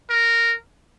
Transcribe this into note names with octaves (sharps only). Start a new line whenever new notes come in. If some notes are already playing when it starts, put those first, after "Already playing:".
A#4